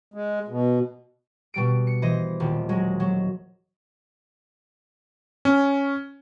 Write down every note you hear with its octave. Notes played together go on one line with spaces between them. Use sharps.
G#3
B2
B2 G3 D7
C#7
E3 C5 D#5
D#1
F#3 G#3
F#3
C#4